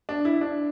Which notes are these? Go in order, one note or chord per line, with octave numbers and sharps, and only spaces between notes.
D4
E4
D4